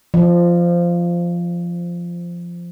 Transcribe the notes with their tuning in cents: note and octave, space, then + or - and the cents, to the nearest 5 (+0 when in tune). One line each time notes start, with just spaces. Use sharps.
F3 -10 D5 +45